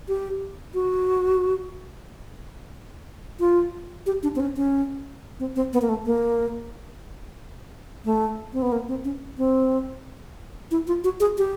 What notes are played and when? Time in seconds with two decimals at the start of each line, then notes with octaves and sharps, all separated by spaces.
0.08 G4
0.74 F#4
3.40 F4
4.06 G4
4.23 D4
4.36 C4
4.40 C#4
4.56 C#4
5.40 C4
5.56 C4
5.73 B3
5.82 A#3
5.89 A3
6.06 A#3
8.05 A3
8.53 C4
8.62 B3
8.72 A#3
8.88 C4
9.05 C#4
9.38 C4
10.71 E4
10.87 F4
11.04 F#4
11.20 G#4
11.38 G4